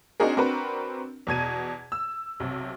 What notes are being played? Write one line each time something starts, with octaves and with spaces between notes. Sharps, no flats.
C4 D4 D#4 F#4 G#4 A#4
C4 D4 F#4 A#4 B4
E2 B2 G#6 D#7
E6
B1 C3